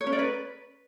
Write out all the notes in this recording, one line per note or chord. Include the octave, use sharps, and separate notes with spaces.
C#5
C#4
D5
B4